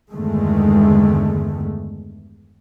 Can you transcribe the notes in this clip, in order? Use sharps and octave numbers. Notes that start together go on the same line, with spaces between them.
E2 G2 D3 D#3 G#3 A3